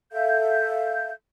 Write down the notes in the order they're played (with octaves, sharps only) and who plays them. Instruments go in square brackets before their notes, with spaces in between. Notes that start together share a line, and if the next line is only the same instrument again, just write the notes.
[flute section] A4 E5 F5 G6